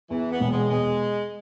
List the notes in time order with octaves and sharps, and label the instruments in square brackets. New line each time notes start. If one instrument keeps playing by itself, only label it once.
[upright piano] E2 [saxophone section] E3
[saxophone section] B3
[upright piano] E1
[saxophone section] G#3
[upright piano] B2 [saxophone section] G#3